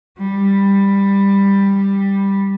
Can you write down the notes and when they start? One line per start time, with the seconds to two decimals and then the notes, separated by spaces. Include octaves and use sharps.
0.19 G3